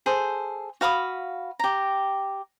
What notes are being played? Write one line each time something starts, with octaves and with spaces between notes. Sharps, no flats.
G#4 A4 C5
F#4 F5 B5 D#6
G4 A#5